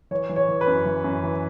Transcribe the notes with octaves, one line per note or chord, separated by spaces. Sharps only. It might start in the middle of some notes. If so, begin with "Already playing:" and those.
E3 C#5
E3
C#5
E3
B4
F#2
E3
F#2
E3